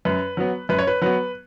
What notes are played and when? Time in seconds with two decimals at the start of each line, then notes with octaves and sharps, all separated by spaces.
0.05 F#2 B4
0.37 F#3 B3
0.69 F#2 B4
0.79 C#5
0.87 B4
1.02 F#3 B3 B4